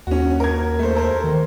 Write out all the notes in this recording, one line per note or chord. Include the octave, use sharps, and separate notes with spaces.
D#2 C#4 F#4
A#4 G#6
A3 C5
A4 A#4 C5
D#3